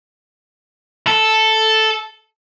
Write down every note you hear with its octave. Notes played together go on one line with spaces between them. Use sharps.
A4